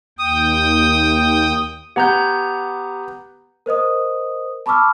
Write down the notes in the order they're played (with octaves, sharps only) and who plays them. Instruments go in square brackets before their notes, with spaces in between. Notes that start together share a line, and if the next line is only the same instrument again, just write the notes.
[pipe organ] D#2 G5 [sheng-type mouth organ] D#6
[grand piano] B3 F#5 [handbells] G4 A#5 G6
[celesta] A#4 C5 D#5 D#6
A5 B5 C#6 D6 E6 F6